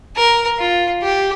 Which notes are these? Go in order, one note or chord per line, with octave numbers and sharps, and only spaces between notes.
A#4
F4
G4